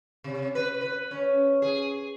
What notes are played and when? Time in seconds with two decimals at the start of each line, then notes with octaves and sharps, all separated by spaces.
0.24 C3
0.55 B4
0.81 B4
1.11 C#4
1.62 G#4